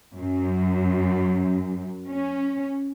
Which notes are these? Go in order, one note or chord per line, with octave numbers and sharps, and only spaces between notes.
F#2
C#4